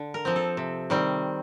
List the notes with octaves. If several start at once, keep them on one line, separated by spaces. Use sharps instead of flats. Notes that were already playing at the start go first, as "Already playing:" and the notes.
Already playing: D3
A#4
F3 C4
A4
C3
D#3 G3 C4